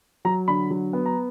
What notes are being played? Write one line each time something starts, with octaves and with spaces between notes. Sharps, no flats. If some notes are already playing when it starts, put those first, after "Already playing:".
F#3 A#5
D3 B5
F#3
B3
A#5